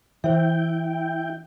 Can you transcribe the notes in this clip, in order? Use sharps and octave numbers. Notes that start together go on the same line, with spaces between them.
E3 E4 C5 E5 G5